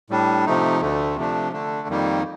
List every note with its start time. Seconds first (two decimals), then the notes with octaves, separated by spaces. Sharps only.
0.10 A2 G3 D4
0.46 C3 F3 A3 D#4
0.81 D2 D3 A3
1.16 C3 F3 A3 D4
1.53 D3 A3 D4
1.88 F2 D#3 G3 A#3 D#4